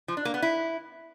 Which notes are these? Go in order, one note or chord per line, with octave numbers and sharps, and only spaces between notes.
F3
D4
A#3
B3
E4